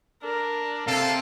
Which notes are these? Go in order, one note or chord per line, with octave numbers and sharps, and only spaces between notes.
D4 A#4
C3 A4 F5